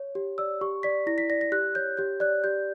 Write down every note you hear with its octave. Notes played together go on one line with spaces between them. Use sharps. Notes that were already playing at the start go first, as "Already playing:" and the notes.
Already playing: C#5
G4
D5 E6
G4 C#6
D5 B6
E4 A#6
B6
D5 A#6
A#6
G4 F#6
C#5 G6
G4 G6
D5 F#6
G4 G6